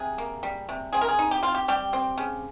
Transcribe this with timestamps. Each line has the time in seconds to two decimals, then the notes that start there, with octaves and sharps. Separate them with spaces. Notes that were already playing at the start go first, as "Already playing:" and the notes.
Already playing: C3 G#4
0.18 A#3
0.43 G3
0.69 C3
0.93 C4 G#4
1.01 A#4
1.09 G#4
1.19 D#4
1.31 G4
1.43 C4 F4
1.54 G4
1.68 G3 G4
1.93 C4
2.18 C#3